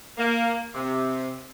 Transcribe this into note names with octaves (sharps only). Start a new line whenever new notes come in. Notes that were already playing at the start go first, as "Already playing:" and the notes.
A#3
C3